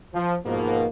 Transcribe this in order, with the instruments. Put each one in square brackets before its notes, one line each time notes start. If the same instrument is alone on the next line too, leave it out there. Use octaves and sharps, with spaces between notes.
[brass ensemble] F3
G#2 B2 F3 A#3